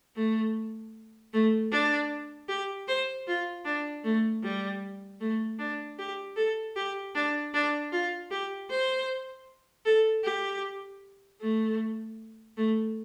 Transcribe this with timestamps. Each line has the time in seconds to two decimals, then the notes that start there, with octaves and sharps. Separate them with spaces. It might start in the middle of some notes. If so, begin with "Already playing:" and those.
0.16 A3
1.33 A3
1.72 D4
2.48 G4
2.88 C5
3.27 F4
3.65 D4
4.04 A3
4.43 G3
5.20 A3
5.59 D4
5.99 G4
6.36 A4
6.76 G4
7.15 D4
7.54 D4
7.92 F4
8.31 G4
8.70 C5
9.85 A4
10.24 G4
11.41 A3
12.57 A3